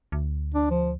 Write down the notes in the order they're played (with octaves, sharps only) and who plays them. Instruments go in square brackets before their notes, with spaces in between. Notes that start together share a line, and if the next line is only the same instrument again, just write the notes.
[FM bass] D2
[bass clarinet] D4
F3